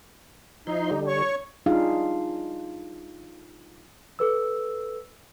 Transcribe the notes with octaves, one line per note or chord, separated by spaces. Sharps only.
F3 D#4 E4 C6
D3 G3
C#5 C#6
G3 D4 D#4 F4 G#4 F5
A4 B4 E6